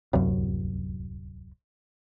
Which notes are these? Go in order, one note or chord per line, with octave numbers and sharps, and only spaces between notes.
D1 C2 F#2